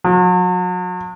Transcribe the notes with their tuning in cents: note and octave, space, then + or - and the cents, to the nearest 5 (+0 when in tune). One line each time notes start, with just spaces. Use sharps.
F#3 -40